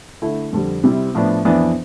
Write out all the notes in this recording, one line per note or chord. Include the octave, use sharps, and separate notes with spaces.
D3 A3 E4
F2 D3 G3
C3 G3 C4 E4
A2 F3 B3 D4
F2 E3 B3 D4